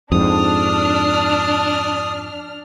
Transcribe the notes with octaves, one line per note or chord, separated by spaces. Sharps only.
F2 G#2 D4 D#6 F6